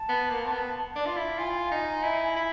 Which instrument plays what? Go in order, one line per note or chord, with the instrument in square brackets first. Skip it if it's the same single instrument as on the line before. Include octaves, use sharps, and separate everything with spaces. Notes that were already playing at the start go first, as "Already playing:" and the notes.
Already playing: [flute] A5
[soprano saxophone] B3
A#3
C4
B3
D4
F4
E4
[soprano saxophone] F4 [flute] G#5
[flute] G5
G#5
[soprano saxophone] D#4
E4
E4